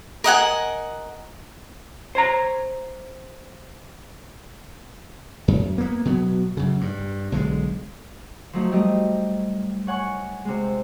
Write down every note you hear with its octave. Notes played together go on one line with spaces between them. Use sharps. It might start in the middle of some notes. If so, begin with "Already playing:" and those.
A#4 D#5 F#5 G#5
C5 C#5 A#5
F#2
A#3 B3
B2 F#3 B3
F#2 C#3
G2
B1 D3 D#3 G#3
F3 F#3 A3 D#4
G3 A3 G4 D#5
C#5 F#5 G#5 C#6
C3 G#3